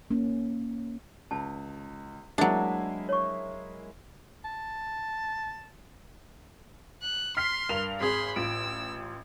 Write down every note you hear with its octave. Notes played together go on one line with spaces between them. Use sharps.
A#3 C#4
C#2 A5
F#3 G#3 A#3 D4 E4
C#5 C#6
A5
F#6
C6 F6 B6 C7
G2 A#4 F7
G#1 G#4 B5 C6
A1 F4 E6 D7